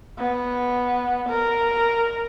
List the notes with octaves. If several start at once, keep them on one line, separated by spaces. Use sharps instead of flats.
B3
A#4